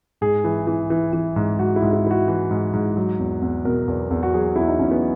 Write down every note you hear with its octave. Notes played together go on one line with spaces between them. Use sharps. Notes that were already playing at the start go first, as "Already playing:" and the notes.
G#2 G#4
E3
E3
E3
E3
G#2
G#2 F#4
E4
G#2
E4
E3 E4
F#4
E3
G#2
G#2
F#3
E2
E2
B2 A#4
E2
E2
F#4
F#3 G#4
E2 E4
D#4
E2 C#4
B3